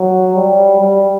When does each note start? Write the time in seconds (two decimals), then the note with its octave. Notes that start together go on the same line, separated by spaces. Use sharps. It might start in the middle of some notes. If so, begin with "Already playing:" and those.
Already playing: F#3
0.35 G3
0.80 G3